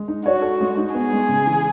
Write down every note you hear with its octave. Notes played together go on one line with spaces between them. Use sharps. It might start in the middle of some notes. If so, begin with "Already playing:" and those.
Already playing: G#3
D#4
F#4 C#5
A4
G#3
D#4
B3 G#4
G#3
C#3
E3